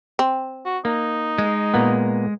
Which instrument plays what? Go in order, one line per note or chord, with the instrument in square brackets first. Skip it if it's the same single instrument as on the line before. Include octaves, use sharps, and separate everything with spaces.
[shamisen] C4
[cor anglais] F#4
[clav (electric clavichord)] A#3 [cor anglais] D#4
[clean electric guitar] G#3
[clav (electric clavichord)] A#2 A#3 B3